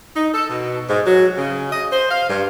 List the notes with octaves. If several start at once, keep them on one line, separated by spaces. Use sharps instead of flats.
D#4
A4
B2
G#2
F#3
C#3
D#5
C5
F5
G2